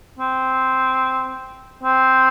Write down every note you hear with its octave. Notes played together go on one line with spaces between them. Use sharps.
C4
C4